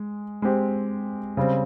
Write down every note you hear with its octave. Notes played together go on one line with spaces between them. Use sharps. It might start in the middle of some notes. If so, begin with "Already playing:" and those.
Already playing: G#3
G#3 C4 G4
C#3 G3 C4